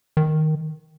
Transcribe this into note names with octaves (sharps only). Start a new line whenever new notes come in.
D#3